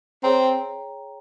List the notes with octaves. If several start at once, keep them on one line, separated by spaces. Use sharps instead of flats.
C4 G#4 C#5 G5 A#5